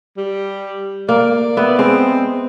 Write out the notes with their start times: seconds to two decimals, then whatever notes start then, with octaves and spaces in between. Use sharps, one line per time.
0.17 G3
1.09 A#3 D5
1.57 B3 E5
1.79 G#3 C4